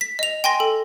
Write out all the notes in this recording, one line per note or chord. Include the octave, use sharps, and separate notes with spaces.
B6
D#5 F7
G5 G#5 C6 A#6
A4